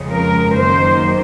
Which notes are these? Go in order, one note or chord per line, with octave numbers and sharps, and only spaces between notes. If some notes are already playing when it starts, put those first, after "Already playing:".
Already playing: F2 C#3 F3 G#3
A#4
F#2 D#3 A#3 C5